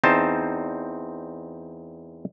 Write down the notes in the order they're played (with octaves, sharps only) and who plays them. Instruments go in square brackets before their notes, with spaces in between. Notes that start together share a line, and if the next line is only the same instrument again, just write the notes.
[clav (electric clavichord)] E2 C4 D#4 C5 A5